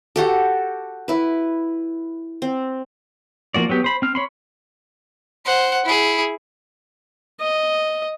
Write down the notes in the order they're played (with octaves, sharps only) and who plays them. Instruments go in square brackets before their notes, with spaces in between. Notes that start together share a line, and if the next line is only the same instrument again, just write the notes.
[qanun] F#4 G4 A4
E4 B4
C4
[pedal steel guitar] F3 A#3 F#4 D5
F#3 B3 G4
C5 B5
C4 F6
C#5 B5 C6
[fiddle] C5 F#5
E4 G#4
[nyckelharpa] D#5